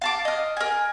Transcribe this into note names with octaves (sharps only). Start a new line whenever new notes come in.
F5 A5 D6
D#5 F6
A#4 G#5